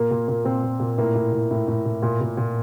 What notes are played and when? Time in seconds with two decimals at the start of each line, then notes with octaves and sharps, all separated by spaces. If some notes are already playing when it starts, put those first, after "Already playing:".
Already playing: A#2 A#3
0.11 A#2
0.28 A#2
0.45 A#2 C4
0.63 A#2
0.80 A#2
0.98 A2 A#3
1.15 A2
1.32 A2
1.51 A2
1.68 A2
1.85 A2
2.03 A#2
2.21 A#2
2.37 A#2